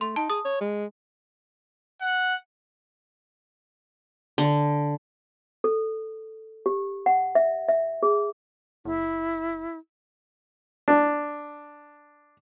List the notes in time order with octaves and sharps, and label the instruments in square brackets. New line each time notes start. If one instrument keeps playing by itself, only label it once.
[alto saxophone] A3 [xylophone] C6
[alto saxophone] D#4 [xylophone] A5
[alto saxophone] G#4 [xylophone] D#6
[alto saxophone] C#5
G#3
[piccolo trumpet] F#5
[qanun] D3
[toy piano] A4
G4
F#5
E5
E5
G#4
[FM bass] F#1 [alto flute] E4
[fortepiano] D4